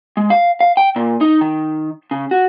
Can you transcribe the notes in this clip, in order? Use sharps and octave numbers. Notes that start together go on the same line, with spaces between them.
G#3
F5
F5
G5
A#2
D#4
D#3
C#3
F#4